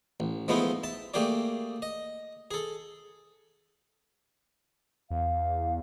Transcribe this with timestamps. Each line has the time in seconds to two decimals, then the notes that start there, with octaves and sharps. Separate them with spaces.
0.20 A1
0.48 F3 G#3 A3 B3 D#4 E4
0.83 E5 A5
1.14 A3 A#3 G4 G#4 D5
1.82 D#5
2.51 G#4 A4
5.10 E2 F5